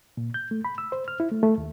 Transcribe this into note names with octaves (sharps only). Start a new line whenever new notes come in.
A#2
G6
A3
B5
E6
C5
F6
E4
A3
A3
D#2